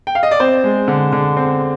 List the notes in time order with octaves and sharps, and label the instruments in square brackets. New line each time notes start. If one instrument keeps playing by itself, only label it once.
[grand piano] G5
F5
D#5
D5
C4 C5
G#3
D3
D3
C4